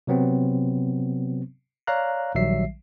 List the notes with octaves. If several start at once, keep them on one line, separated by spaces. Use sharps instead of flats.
C3 F#3 B3 C4
C#5 D5 F5 A#5 F#6
A#1 D#3 F#3 G3 E5 C7